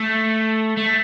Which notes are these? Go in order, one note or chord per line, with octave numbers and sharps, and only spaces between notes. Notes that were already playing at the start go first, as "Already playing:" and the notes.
Already playing: A3
A3